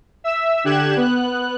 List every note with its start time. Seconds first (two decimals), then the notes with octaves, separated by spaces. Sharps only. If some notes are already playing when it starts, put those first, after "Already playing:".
0.24 E5 E6
0.64 D3 G4 F#6 G#6 E7
0.97 B3 F#6